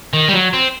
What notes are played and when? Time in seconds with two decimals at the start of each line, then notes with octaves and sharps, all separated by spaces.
0.14 D#3
0.28 G3
0.34 F#3
0.53 C4